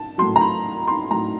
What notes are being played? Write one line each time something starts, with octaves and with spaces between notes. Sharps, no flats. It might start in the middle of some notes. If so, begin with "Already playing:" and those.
Already playing: A5
A2 F#3 C6
A#5
B5
C6
A2 F#3 A#5